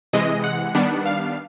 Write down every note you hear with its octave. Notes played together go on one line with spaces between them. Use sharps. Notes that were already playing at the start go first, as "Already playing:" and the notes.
C3 E3 G#3 D#5
F#5
D#3 G3 B3 D4
F5